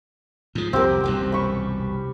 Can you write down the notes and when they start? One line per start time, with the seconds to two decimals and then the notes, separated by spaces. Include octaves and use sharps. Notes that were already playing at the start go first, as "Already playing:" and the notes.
0.55 G#2 F3
0.73 C2 F2 C4 G4 A#4
1.03 E1 C2 F#2 G5
1.32 B5 C#6